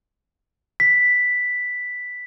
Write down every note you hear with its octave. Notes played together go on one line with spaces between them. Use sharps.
B6